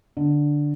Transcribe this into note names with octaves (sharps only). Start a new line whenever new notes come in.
D3